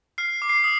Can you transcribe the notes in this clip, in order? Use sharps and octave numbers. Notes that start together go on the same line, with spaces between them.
F6 C7
D6
C7
D#6